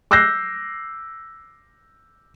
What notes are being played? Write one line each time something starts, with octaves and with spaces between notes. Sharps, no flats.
D6 E6 F#6 G6 A#6 C7